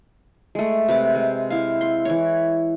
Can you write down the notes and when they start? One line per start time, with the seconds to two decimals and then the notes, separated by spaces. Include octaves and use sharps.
0.55 G#3 A3
0.89 C3 B4 D6
1.16 G#3
1.50 E4 F5
1.81 C6
2.05 E3 C#5